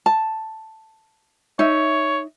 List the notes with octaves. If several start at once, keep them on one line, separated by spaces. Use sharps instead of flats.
A5
D#4 C#5 E5